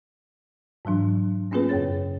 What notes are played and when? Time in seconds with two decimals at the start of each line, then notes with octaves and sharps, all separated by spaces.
0.85 G#2 E3 F#3 D4
1.51 A#3 B3 C#4 F4 G#4 B4
1.69 F#2 C#3 G#4 C#5 A6